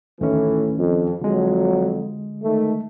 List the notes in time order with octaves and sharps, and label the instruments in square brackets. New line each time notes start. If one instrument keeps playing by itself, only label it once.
[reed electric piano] D2 D#3 C#4 [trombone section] A2 E3 A3
[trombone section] F2
[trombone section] F2 F#3 [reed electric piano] D3 G#3
[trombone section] D#3 A3